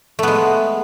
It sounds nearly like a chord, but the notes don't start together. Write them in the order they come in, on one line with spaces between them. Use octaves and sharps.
A3 B3 G#3